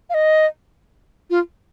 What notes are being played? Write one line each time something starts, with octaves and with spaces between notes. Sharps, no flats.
F5
D#5
F4